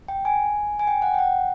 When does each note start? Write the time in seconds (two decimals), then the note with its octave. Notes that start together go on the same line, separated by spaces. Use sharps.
0.08 G5
0.25 G#5
0.79 G#5
0.87 G5
1.02 F#5
1.14 G5
1.19 F#5